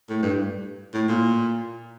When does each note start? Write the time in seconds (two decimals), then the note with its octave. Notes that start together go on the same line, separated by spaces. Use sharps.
0.09 A2
0.23 G2
0.94 A2
1.08 A#2